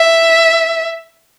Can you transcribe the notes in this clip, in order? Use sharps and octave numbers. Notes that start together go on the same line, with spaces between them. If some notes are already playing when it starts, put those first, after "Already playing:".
Already playing: E5